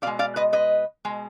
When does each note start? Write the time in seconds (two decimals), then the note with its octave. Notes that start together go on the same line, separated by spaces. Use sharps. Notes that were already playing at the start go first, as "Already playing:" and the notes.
0.02 B2 D5 F5
0.07 G#3
0.19 D5 F5
0.36 B4 D#5
0.53 B4 D#5
1.05 B2 G#3